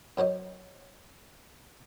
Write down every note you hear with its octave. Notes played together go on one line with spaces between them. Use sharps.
F#2 F#3 C5 D#5